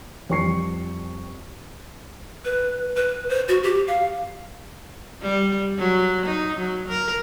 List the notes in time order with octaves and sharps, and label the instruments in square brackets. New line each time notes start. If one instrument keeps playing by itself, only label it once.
[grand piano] F2 G3 C#6 C7 C#7
[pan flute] B4
B4
C5
F#4
G4
F5
[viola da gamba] G3
F#3
D#4
F#3
A#4